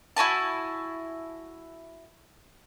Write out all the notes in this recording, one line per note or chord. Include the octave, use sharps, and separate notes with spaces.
E4 F#4 G#5 A5